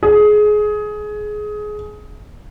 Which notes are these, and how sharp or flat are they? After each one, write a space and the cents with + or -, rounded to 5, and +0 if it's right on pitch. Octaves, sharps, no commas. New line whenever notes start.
G#4 +20